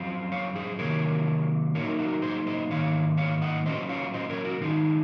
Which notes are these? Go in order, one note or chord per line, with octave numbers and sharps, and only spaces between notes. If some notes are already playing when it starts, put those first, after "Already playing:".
Already playing: F#2 F3 C4 F4
C#5 F5
G#4 C5
C3 D#3 F#3 A#3 A#4 C#5
A#2 F#3 A#3 D#4 A#4 C#5
F#4 A#4
G#4 C5
C5 D#5
G#2 D#3 A#3 C#5 F5
C#5 F5
D#5 F#5
A#2 F#3 C#4 F4 C5 D#5
C#5 F5
C5 D#5
A#4 C#5
F#4 A#4
D#3 G#3 D#4 F4 G#4